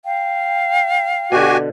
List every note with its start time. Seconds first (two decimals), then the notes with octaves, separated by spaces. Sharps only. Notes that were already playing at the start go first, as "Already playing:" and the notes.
0.05 F5 G5
1.32 B2 D3 F#4 G4 G#5